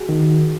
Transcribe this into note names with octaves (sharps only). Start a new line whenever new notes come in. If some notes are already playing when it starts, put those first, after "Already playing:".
Already playing: F#4 G#4
D#3